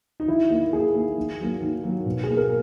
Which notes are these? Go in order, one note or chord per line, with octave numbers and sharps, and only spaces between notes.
D#4
D#3 E4
A#3
D#3 G#4
A#3
D#3
F#3 A#3
D#3
F#3 A#3
B2
A#3 G#4
A#4